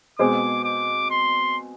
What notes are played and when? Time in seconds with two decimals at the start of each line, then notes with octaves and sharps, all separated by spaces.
0.19 B2 G#3 C4 G#4 C5 D6
0.64 D6
1.11 C6